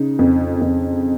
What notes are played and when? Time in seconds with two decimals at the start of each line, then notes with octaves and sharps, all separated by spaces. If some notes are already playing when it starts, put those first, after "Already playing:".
Already playing: C#3 D#4
0.19 F2
0.61 F2